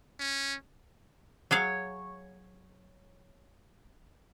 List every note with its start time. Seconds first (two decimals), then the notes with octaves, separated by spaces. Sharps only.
0.19 C#4
1.51 F#3 G#4 C#5 F5